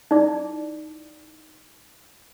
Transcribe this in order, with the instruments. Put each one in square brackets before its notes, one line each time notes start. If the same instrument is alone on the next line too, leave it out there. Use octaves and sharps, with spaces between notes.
[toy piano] D#4 E4 D5 D6